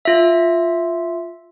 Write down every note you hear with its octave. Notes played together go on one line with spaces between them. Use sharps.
F4 E5